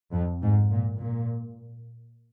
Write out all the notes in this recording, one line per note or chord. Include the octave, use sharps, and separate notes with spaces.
F2
G#2
A#2
A#2